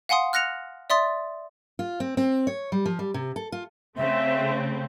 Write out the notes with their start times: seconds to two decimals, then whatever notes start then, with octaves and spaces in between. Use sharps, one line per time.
0.09 F5 F#5 G#5 C6 D#6
0.33 F6 F#6 A#6 C#7 F7
0.90 D5 E5 C6 D#6 A6
1.79 F4
2.00 C4
2.17 C4
2.47 C#5
2.72 G3
2.86 F3
2.99 G3
3.14 C3
3.36 A4
3.52 F4
3.97 C#3 A3 C4 E5